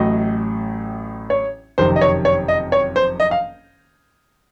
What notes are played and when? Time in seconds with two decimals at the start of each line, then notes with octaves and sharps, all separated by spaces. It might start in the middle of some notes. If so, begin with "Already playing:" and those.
Already playing: A1 A2 F#3 D#5
1.30 C#5
1.78 F#1 F2 C3 D#3 C5
1.96 D#5
2.01 C#5
2.25 C#5
2.48 D#5
2.72 C#5
2.96 C5
3.20 D#5
3.31 F5